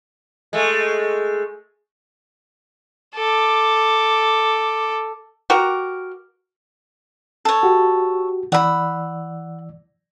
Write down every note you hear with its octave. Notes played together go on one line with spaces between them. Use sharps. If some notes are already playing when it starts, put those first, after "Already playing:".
G#3 A3
A4 D6
F#4 G4 A#4
A4 C#5
F#4 G4
E3 D5 F#5 B5 E6